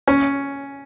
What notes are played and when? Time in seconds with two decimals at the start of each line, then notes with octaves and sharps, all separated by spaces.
0.07 C#4